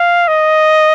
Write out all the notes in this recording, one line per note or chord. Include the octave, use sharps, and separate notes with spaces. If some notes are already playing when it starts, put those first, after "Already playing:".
Already playing: F5
D#5